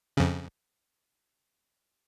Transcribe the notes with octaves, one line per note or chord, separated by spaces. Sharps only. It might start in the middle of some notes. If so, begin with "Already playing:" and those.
F2 C#3